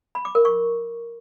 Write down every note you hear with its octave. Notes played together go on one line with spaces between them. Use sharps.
B5
D6
A#4
C#6